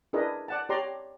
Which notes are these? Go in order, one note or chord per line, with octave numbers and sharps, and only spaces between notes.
D4 E4 G#4 A#4 B4 D#5
D5 F#5 A5
G4 C#5 D5 A#5 C6